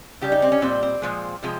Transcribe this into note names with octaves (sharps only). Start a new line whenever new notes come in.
C#3 G3 G4
D#4
C4
C#4
A#2 G3 C4
C4
A#2 F3 G#3
C3 F3 G#3